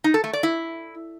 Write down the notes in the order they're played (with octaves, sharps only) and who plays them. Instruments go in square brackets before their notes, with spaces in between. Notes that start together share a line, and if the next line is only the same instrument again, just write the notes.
[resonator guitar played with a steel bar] D#4
A4
A3
D5
E4